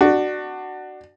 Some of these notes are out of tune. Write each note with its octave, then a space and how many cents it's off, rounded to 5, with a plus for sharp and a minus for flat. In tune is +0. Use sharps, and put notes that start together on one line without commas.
D4 +20 F#4 +10